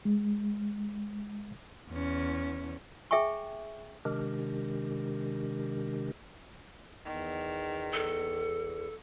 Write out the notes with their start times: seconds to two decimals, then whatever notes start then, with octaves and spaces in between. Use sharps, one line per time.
0.05 G#3
1.89 E2 C#4
3.11 G#4 E5 G5 G#5 C#6
4.05 C3 D#3 G#3 D4 G4 A#4
7.05 E2 D#3
7.93 A4